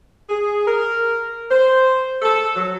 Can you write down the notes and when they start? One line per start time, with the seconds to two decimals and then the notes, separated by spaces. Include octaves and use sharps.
0.29 G#4
0.67 A#4
1.49 C5
2.22 A4
2.56 F#3